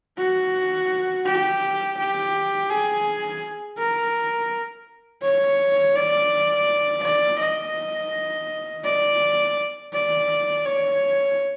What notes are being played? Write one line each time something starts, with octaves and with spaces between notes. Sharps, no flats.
F#4
G4
G4
G#4
A#4
C#5
D5
D5
D#5
D5
D5
C#5